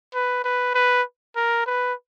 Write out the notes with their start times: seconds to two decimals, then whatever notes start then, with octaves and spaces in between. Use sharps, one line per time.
0.14 B4
0.44 B4
0.75 B4
1.36 A#4
1.66 B4